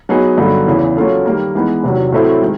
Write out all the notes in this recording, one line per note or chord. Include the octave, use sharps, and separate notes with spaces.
F#3 B3 D#4 G#4
G2 D3 F#3 B3 D#4
E2 C#3 E3
F#3 A#3 C#4 F4 A4
D#3 G3 A#3
E3 G#3 B3 D#4
E2 C3 D#3 F#3
A2 F#3 A3 C4 E4
D#3 G#3